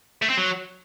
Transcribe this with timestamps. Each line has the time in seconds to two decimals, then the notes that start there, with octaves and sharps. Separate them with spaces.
0.22 A3
0.30 C4
0.37 F#3